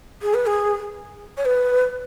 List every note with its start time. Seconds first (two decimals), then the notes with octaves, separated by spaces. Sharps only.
0.22 G#4
0.34 B4
0.46 G#4
1.37 C#5
1.45 B4